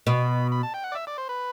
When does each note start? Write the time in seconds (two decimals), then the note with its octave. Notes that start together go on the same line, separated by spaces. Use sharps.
0.07 B2 B5
0.52 B5
0.63 A5
0.74 G5
0.84 F#5
0.92 D5
0.95 E5
1.07 D5
1.18 C5
1.29 B4